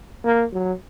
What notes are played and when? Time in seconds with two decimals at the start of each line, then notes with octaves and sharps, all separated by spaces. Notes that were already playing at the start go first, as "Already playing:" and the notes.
0.24 A#3
0.53 F#3